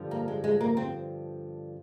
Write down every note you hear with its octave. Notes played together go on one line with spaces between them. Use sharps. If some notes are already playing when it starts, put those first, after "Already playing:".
Already playing: G2 D3 F3
A#3
G#3
G#3
A#3
C4